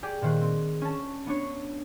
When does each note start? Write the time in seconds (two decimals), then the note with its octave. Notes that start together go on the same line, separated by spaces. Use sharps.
0.03 G4 G#4 D5 G5
0.22 A#2 D#3 C5 F#6
0.42 C4
0.81 C#4 A5
1.26 B3 D4 C#5